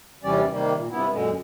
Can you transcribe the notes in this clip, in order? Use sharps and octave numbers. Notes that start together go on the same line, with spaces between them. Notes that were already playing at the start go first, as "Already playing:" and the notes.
D#2 C3 E3 G3 C#4 D5
C3 D#3 G3 A#3
A#2
G2 C3 B3 E4
F#2 A#2 D3 G#3